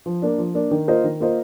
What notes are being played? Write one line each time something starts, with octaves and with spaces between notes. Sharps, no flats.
F3
A#3 D4
F3
A#3 D4
D#3
A#3 F4 C5 D#5
D#3
A#3 F4 C5 D#5